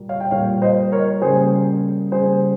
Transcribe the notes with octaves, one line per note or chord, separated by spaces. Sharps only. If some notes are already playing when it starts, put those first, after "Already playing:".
Already playing: A#2 G3 A#3
C#5 F5
G5
A#2 G3 A#3 C#5 F5
C5 D#5
A#4 C#5
C#3 G3 A#3 G#4 C5
C#3 G3 A#3 G#4 C5